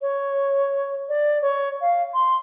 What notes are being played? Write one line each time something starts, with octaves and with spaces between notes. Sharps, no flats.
C#5
D5
C#5
F5
C6